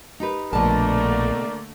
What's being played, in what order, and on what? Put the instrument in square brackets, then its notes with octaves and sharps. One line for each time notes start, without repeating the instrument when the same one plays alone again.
[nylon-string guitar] D#4 G4 B4
[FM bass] A#1 [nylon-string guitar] B2 A5 [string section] D3 A3 A#3 [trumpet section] A#4 D5